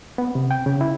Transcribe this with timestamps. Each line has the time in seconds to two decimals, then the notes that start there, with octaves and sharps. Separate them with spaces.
0.18 B3
0.35 C3
0.51 G5
0.66 C#3
0.81 E4